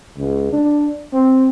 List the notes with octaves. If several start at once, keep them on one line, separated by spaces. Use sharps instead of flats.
C#2
D4
C4